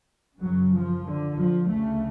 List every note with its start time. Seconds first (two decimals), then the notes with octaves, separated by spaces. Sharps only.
0.39 F#2 C#3 F#3
0.72 F3
1.05 D3
1.36 F3
1.69 D2 C#3 A3